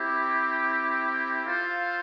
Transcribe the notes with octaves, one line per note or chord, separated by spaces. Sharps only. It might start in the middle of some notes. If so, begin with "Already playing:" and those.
Already playing: C4 E4 G4
F4 A4 C5 F5